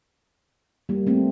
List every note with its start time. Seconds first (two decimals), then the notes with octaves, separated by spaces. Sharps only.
0.89 G3 A#3
1.07 A3 C4